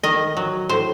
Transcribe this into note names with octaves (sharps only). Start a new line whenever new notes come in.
D#3 D#5
F#3
A2 C5